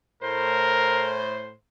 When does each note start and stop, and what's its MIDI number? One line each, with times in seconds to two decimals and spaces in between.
0.23 1.53 45
0.23 1.19 70
0.23 1.53 72